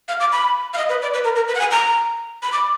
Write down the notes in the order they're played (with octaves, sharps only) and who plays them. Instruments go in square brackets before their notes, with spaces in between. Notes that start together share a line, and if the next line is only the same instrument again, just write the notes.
[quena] F5
D6
B5
F5
D#5
B4
D5
B4
A#4
A#4
B4
F#5
G#5
A#5
B5
D6